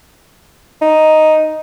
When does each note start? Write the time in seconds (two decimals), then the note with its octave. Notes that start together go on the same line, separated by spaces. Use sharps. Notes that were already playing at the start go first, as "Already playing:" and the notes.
0.81 D#4